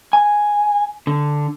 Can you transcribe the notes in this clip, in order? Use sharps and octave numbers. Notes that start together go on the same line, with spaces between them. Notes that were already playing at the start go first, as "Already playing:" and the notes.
G#5
D3